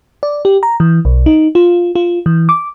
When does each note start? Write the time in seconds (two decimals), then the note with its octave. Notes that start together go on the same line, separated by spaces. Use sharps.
0.23 D5
0.45 G4
0.63 A#5
0.80 E3
1.05 B1
1.26 D#4
1.55 F4
1.95 F4
2.26 E3
2.49 D6